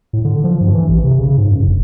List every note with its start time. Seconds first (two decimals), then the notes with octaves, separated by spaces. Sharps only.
0.13 A2
0.25 D3
0.44 F3
0.61 G2
0.73 E3
0.89 A#1
1.04 C3
1.18 C#3
1.37 G#2
1.51 F#2
1.67 F1